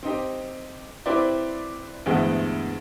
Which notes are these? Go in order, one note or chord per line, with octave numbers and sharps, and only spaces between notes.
C4 D#4 G4
C4 E4 G4 B4 C5 D5
D2 G2 E3 G#3 B3